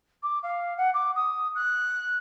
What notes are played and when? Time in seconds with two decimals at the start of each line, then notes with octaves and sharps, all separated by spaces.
0.23 D6
0.43 F5
0.77 F#5
0.94 D6
1.16 D#6
1.55 F#6